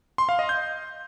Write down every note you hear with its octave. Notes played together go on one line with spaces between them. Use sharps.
C6
F5
D#5
G6